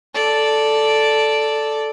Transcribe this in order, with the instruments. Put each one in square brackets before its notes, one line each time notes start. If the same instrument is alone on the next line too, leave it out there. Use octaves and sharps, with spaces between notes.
[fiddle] A4 D5